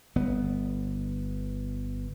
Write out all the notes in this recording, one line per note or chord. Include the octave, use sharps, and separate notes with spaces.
G1 B3